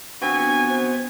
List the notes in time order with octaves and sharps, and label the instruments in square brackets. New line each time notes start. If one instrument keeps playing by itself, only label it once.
[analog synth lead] B3 [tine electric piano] C4 F#4 [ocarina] D4 [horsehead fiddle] G#5
[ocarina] C5